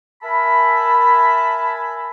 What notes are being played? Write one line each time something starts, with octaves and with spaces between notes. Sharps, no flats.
A#4 E5 G#5 A5 B5